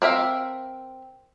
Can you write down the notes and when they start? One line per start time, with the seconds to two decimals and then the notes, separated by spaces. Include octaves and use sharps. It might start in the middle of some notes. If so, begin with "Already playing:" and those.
0.02 C4 A#4 E5 F5